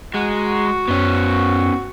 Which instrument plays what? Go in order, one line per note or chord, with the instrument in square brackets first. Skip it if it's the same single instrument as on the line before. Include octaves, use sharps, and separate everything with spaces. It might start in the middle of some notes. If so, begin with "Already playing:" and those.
[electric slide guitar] G#3 [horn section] F#4 [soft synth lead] A#5
[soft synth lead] F#2 [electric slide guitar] B3 C#4